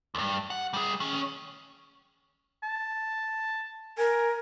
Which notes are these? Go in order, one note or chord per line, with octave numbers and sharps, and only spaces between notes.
D2 G2
F#5
G3 G#4
D#3 C#4
A5
A#4 G#5